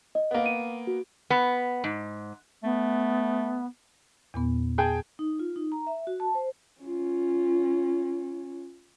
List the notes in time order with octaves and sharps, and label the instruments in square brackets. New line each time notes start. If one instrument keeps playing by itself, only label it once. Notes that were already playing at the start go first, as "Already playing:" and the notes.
[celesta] D#5
[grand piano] A#3 B3
[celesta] D#7
F#4
[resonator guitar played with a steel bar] B3
G#2
[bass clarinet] A3 [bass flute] B3
[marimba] E2 A#2 B3
[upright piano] G#4 G5 A5
[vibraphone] D#4
F4
D#4
A#5
E5
F#4
A5
C5
[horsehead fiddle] C#4 F4